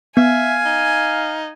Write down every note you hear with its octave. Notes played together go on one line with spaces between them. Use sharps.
B3 E5 F5 G#5
D#4